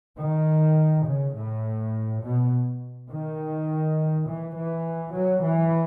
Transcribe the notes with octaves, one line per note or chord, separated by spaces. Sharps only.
D#3
C#3
A2
B2
D#3
E3
E3
F#3
E3